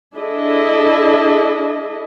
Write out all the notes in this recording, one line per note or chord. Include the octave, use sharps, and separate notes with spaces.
D4 E4 G#4 A4 D#5